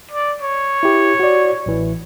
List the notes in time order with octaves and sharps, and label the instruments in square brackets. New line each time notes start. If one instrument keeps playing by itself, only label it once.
[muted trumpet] D5
C#5
[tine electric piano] E4 G4
F#4 D5
A1 E3